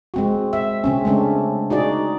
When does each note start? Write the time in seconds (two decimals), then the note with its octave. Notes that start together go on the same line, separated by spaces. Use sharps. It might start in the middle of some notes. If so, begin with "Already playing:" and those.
0.14 G#3 C4 F#4
0.53 E5
0.84 C#3 C4 C#4
1.05 G#3 A3 C#4 D4
1.70 D#4 F#4 G#4 D5